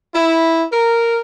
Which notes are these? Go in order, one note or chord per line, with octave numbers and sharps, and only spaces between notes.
E4
A#4